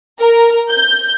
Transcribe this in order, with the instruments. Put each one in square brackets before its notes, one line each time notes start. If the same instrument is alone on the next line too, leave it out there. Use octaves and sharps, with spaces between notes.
[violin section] A#4
G6